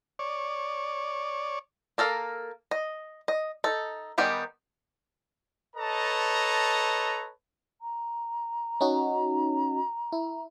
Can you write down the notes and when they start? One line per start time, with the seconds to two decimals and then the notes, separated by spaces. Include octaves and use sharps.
0.19 C#5 D5
1.98 A#3 A4 A#4 F5
2.71 D#5
3.28 D#5
3.64 D#4 A4
4.18 D#3 G3 B3 G4 G#4
5.76 A4 B4 C#5 D#5 A5 A#5
7.82 A#5
8.81 C#4 D#4 F#4
10.12 E4